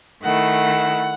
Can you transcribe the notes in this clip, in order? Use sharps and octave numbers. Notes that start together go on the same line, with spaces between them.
D#3 A3 E4 F#5